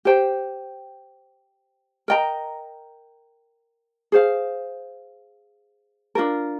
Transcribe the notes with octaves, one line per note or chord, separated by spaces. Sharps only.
G4 C5 G5
A#4 D#5 G5 A#5
G#4 C5 F5
D4 F4 A#4